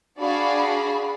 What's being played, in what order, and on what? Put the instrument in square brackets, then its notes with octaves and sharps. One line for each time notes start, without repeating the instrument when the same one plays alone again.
[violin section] D4 F#4 G#4 D5 F5 B5